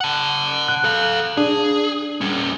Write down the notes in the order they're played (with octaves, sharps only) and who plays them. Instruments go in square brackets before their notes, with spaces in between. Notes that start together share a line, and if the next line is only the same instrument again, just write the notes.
[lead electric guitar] F#5 A5
[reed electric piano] F#6
[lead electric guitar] A4 F5
[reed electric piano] D4 [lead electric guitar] G#4
[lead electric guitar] G3 C#4